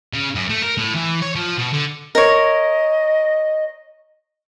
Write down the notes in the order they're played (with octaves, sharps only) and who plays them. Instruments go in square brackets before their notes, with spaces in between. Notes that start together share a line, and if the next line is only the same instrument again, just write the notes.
[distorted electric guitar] C#3
F#2
A3
A#4
A2
E3
C#5
F3
B2
D3
[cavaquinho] A#4 C#5 [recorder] D#5